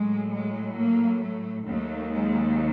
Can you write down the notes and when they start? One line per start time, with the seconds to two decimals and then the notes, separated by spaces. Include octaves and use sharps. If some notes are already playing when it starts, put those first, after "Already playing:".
Already playing: A2 F#3 G#3
0.33 G#3
0.78 A#3
1.24 A3
1.68 D#2 D#3 F#3 A3
2.14 G#3